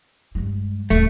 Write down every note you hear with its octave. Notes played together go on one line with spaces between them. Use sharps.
G2 G#3
D#1 A1 A3